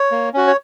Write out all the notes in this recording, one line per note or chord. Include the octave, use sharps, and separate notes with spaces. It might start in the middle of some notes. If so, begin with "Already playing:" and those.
Already playing: C#5
A#3
C#4 F#4
C#5